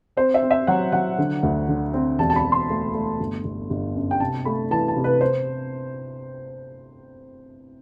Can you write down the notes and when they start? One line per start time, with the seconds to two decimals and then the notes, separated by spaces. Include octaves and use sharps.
0.17 C4 C5
0.34 E5
0.42 C4
0.51 E5
0.67 F#3 F#5
0.92 F#3 F#5
1.18 D3
1.43 D2
1.68 D3
1.94 C4
2.19 E1 A5
2.30 A5
2.36 B5
2.44 E1
2.52 C6
2.70 A3
2.94 A3
3.20 G1
3.44 G1
3.70 G1
3.95 F#2
4.11 G5
4.20 C3 A5
4.45 A3 B5
4.71 E3 A5
4.88 A5
4.96 C3
5.04 B4
5.21 C5